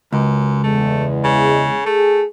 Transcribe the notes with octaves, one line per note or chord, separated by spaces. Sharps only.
C#2 F#2
E2 G#3 A3
C#3
A3 G#4